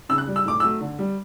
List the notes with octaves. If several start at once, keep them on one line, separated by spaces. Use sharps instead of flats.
C#3 E6
F#6
G3
E6
A2 D6
F#3 A3 E6
D3
G3